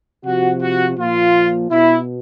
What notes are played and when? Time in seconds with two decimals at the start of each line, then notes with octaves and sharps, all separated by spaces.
0.24 C3 F3 F#4
0.60 F#4
0.97 A#2 F3 F4
1.70 B2 E4